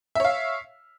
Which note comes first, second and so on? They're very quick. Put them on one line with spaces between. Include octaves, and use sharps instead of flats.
E5 C#5 F5